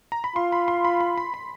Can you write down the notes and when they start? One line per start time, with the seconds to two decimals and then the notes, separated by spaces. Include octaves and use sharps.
0.12 A#5
0.24 B5
0.36 F4 C6
0.52 B5
0.68 C6
0.85 B5
1.00 B5
1.17 B5
1.34 B5